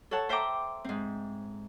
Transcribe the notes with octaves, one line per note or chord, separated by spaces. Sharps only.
A4 C#5 F#5 A5
C5 E5 G5 A#5 D6
G#2 C4